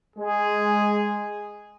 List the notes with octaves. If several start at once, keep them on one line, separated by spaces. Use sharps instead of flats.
G#3 G#4